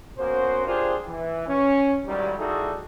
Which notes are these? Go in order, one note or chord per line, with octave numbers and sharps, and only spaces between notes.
A#3 B3 C#4 F#4 C5
D4 F4 G4 G#4 A#4 C5
E3
C#4
A1 G#2 D#3 F#3 G3
G3 D#4 E4 F#4 G#4 A4